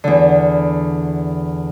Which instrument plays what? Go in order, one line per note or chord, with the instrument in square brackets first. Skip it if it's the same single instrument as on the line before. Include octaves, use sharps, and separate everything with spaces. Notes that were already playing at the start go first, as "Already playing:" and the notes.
[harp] E2 D3